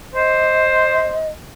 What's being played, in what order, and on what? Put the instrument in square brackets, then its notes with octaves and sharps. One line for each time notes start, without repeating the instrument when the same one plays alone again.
[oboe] C5 [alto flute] D#5